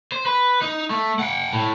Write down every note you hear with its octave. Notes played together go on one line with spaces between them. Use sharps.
C5
B4
D#4
A3
F#5 G5
A2